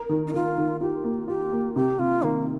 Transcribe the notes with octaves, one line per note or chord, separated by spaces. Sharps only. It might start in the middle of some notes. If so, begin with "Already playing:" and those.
Already playing: A#4
D#3
D#4
D#3 F4
D#3
F4 G4
A#3
F4 G4
A#3
C3 G4
C3 F4
D#3 A#3